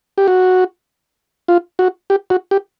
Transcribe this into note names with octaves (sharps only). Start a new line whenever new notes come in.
G4
F#4
F4
F#4
G4
F#4
G4